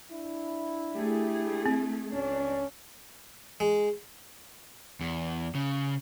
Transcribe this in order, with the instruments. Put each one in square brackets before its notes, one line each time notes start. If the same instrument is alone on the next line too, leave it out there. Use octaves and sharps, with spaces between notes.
[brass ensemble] D4 E4
[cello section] A3 G#4 [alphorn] G4
[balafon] C4
[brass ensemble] C#2 [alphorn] C#4 [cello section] D4
[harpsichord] G#3
[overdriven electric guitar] E2
C#3